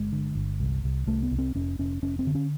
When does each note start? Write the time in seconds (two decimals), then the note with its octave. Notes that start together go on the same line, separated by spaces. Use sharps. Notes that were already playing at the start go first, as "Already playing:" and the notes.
Already playing: G1 G#3
0.12 D3
0.35 G1
0.60 C2
0.84 C2
1.07 C2 A3
1.23 B3
1.31 C2
1.39 C4
1.55 F1 C#4
1.79 F1 C#4
2.02 F1 C#4
2.19 C4
2.27 D3
2.35 C#4